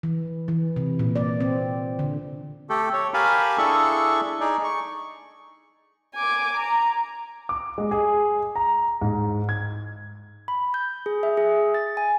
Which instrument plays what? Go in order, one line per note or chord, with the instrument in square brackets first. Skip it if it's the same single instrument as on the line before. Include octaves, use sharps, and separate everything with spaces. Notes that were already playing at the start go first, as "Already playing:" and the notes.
[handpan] E3
E3
C3
A#2
D5
C4
D3
[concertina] A3 G4 A4
C#5
G4 A#4 F5 G#5 A5 B5
D4 E4 G#4 A4 C#6
D#4 G#4 D5
C#6
[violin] G#5 D6
A#5
[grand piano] D6
G#3
G#4
A#5
G#2
G#6
[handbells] B5
G6
G#4
E5
G#4
A6
G#5